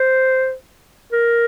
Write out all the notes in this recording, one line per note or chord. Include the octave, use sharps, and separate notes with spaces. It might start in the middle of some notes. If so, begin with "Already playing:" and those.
Already playing: C5
A#4